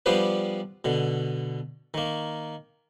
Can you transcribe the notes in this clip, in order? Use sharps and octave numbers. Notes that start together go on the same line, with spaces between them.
F3 G3 B3 D4 B4 C5
B2 D3
D#3 A#3